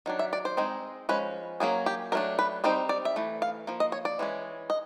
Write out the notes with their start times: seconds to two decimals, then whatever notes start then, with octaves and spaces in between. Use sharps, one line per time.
0.06 D#3 F#3 D4
0.19 E5
0.33 D5
0.45 C5
0.57 G#3 C4 D#4
1.09 F3 G#3 C#4 B4
1.60 F#3 A#3 C#4 G#4
1.86 G4
2.12 F#3 A3 D4 A#4
2.39 B4
2.64 G3 C4 D#4 C5
2.89 D5
3.05 E5
3.16 E3 A3
3.42 F5
3.67 F3 A#3
3.80 D#5
3.92 C#5
4.05 D5
4.19 E3 G#3 C#4
4.70 D#5